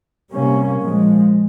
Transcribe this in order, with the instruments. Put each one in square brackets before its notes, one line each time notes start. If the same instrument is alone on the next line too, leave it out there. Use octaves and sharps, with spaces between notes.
[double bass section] C3 G3 A#3 C#4
A#2 F3 G#3